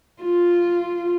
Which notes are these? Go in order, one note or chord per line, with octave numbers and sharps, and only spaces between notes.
F4